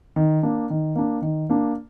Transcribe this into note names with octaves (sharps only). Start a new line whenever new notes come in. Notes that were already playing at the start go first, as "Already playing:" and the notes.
D#3
A#3 D4
D#3
A#3 D4
D#3
A#3 D4